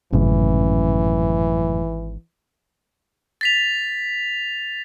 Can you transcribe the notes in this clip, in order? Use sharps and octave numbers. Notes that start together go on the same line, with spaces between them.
G#1 F#2 A2 C#3 E3
A6 B6 F7